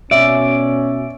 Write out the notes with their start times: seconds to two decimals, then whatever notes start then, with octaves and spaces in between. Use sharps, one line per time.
0.11 B2 C#4 D5 E5